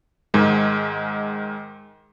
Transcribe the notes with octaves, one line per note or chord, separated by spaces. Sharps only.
G#2 D#3 G#3